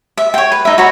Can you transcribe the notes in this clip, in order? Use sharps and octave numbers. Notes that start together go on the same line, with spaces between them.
E5
C#5 G5
B4
D#4 E5
F#4 C#5 A#5 B5